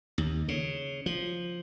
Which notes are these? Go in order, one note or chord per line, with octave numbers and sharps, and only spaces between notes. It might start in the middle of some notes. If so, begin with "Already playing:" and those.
D#2
C#3
F3